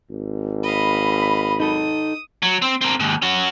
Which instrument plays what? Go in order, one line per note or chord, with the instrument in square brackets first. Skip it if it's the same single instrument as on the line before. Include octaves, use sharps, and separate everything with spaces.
[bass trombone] G#1
[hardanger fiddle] D#5 F5 [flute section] B5
[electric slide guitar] D#4 A4 [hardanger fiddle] D#6
[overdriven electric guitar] F#3
C4
C4 A#4
D#2 G#2
C#4 F#4